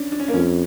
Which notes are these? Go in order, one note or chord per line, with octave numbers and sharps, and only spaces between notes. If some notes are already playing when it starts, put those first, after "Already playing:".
Already playing: C#4 D4
D4
C#4
A#3
F2 C#4